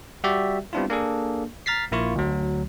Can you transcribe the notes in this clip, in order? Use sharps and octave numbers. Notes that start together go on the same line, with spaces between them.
G3 F#4 G4 D5 E5
G3 B3 C4 D4 E4 F4
A#3 D4 G#4 A4
A#5 F6 A6 B6 C7
A#1 A#3 E4 F4 C#6
D2 F#3